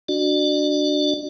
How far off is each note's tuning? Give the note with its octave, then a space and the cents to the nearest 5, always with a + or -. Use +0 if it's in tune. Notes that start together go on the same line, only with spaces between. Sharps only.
D4 +0 F#4 +0 D5 +40